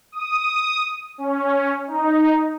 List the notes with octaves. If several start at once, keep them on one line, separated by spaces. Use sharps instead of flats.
D#6
C#4
D#4